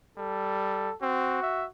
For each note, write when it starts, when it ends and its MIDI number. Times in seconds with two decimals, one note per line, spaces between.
0.18 0.90 55
0.18 0.95 69
1.02 1.42 60
1.02 1.68 66
1.43 1.66 76